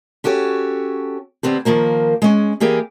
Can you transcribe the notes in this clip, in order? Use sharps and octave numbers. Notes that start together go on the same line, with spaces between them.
C#4 F#4 G4 A4 C#5
D3 B3 C4 G4
D#3 F3 A#3 C5
G#3 C#4
E3 A#3 G4 G#4 D5